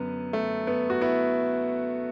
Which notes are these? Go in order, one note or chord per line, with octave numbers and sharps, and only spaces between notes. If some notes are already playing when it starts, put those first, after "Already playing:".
Already playing: F#2 D3 B3
A3
B3
F#4
B3 E4